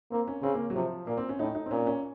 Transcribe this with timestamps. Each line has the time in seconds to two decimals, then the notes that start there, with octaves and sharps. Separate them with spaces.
0.11 A#3 C4
0.28 C#4
0.43 C#3 C4
0.54 A#3
0.70 F#3
0.75 C3 F3
1.07 A#2 A#3
1.18 C4
1.29 C#4
1.39 A2 D#4
1.55 D#4
1.66 C4
1.71 A#2 C#4
1.87 C#4